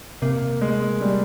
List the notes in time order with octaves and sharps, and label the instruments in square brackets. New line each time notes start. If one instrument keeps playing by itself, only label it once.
[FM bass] C3 [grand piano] A#3
[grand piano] G#3
G3